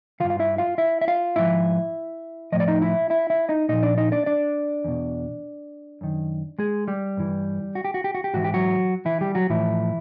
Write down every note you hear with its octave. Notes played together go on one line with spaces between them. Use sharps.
G2 D#3 F4 F5
F5
E4 E5
F4 F5
E4 E5
E5
F4 F5
G#2 F3 E4 E5
A2 F3 D#5
D5
D#4 D#5
E4 E5
E4 E5
E4 E5
D#4 D#5
A#2 F3 D#4 D#5
D4 D5
D#4 D#5
D4 D5
D4 D5
E2 B2
F#2 D#3
G#3 G#4
G3 G4
G2 E3
F#4
G4
F#4
G4
F#4
G4
G#2 E3 F#4
G4
F#3 F#4
E3 E4
G3 G4
F#3 F#4
A2 E3 F3 E4